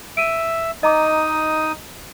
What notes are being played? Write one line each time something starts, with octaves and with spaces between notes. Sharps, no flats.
E5 D7 D#7
D#4 D#5 A#5 D6 D#6